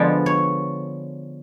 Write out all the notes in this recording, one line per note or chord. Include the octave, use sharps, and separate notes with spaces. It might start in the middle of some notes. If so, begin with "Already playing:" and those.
Already playing: D3 F3 G#3 B3 D5
C#5